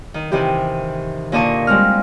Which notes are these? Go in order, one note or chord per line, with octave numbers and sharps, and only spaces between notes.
D#3
C3 D#3 E3 G4
A#2 D3 D4 D#5 A5 C#6
G3 G#3 C4 F6